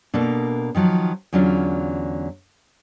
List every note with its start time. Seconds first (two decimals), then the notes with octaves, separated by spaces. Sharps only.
0.14 B2 A#3 D4 A4 A#4
0.75 D#3 F3 F#3
1.33 E2 D3 F#3 C#4 F4